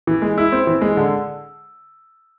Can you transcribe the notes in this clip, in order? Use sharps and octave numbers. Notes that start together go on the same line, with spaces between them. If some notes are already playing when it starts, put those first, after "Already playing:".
E3
G#3
E4
C4
E3
G#3
D3